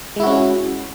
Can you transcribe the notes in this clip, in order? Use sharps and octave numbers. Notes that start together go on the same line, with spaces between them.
G#3 C#4 E4 F#4